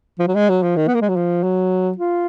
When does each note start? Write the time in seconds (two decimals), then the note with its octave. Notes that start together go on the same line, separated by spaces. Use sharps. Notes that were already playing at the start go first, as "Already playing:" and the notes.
0.19 F3
0.28 F#3
0.35 G#3
0.50 F#3
0.63 F3
0.76 D#3
0.88 B3
0.94 A#3
1.01 G#3
1.09 F#3
1.16 F3
1.43 F#3
1.98 F4